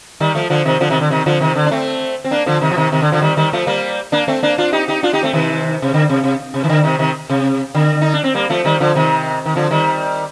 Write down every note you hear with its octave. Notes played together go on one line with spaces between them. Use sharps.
D#3 G3
F3 A3
D3 F3
C3 D#3
D3 F3
C3 D#3
D3
C3 D#3
D3 F3
C3 D#3
D3
D4
A3 C4
C4
A#3 D4
D3 F3
C3 D#3
F3
C3 D#3
C3 D#3
D3
D3 F3
D#3 G3
D#3 G3
F3 A3
G3 A#3
A#3 D4
A3 C4
A#3 D4
D4 F4
D#4 G4
D#4 G4
D4 F4
D#4 G4
A3 C4
C3 D#3
C3
D3
C3
C3
C3
D#3
D3
C3 D#3
C3 D#3
C3
D3
D#4
D4
C4
G3 A#3
F3 A3
D#3 G3
D3 F3
C3 D#3
D#3
D3 F3
D#3 G3